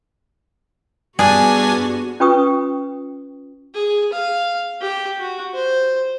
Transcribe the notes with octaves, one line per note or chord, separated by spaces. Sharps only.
G2 B3 D4 F#4 G#4 G#5
C#4 F4 B4 G5 C#6 D#6
G#4
F5
G4
F#4
C5